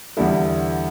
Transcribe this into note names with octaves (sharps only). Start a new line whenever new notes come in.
E2 D3 G3 E4 A4